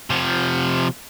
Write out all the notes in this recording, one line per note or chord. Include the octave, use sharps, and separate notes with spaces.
C3 F3